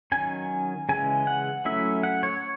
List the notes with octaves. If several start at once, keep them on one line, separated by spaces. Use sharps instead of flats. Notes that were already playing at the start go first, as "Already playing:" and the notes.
D#3 F#3 C#4 G#5
C#3 E3 G#3 G#5
F#5
F#3 A3 C#4 E4 E5
F#5
C#5